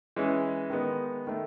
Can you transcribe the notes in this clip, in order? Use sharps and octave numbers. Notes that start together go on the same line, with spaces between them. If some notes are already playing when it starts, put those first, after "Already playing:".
E3 G#3 C#4
D#3 G#3 B3 D#4
D#3 A3